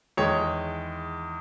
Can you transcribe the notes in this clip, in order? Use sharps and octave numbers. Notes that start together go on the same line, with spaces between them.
E2 D#3 G#3 C#5